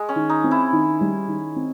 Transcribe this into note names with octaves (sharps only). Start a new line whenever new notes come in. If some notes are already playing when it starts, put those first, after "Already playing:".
Already playing: G#3
C#4
D#3
D#4
C4
E4
D#3
G3
D#3
C4